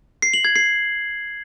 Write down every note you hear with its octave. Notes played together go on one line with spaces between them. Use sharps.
C7
F#7
G#6
C7